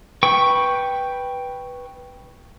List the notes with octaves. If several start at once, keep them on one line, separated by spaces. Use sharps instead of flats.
B4 G5 C#6